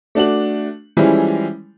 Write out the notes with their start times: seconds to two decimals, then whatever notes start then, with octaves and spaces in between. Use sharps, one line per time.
0.15 A3 D4 F#4 F#7
0.97 E3 F3 G3 G#3 C#4 E4